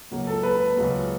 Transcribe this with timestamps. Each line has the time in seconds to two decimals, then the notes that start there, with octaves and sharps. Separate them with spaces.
0.11 C#2 C#3 F#3 A#3
0.27 A4
0.43 B4
0.60 B4
0.75 C#2 C#3 F#3 A#3